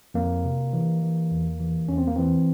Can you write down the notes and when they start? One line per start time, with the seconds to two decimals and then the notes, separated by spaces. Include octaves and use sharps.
0.14 F2 A#3
0.45 C3
0.73 E3
1.02 E3
1.31 E2
1.60 E3
1.88 E2 C#4
1.97 C4
2.07 A#3
2.16 E3 C4